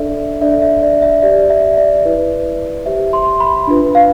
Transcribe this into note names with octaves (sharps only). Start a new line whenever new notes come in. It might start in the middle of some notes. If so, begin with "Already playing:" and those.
Already playing: D4 A4 D5 E5
D4 A4 D5 E5
E5
D5
E5
G4 C5 D5
E5
D5
E4 B4 D5
G4 C5 E5
C6
B5
D4 F4 B4
F5